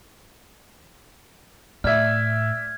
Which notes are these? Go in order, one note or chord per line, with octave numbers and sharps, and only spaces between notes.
A2 D5 E5 F6 G#6